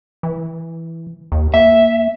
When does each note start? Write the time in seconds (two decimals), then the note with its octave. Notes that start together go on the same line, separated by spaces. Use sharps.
0.23 E3
1.32 D#2
1.54 A#3 E5